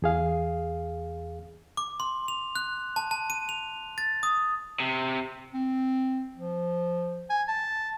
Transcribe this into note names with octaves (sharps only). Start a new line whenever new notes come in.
E2 G#4 F5
D6
C6
F7
F#6
A5
A5
D#7
F7
A6
D#6
C3
C4
F3
G#5
A5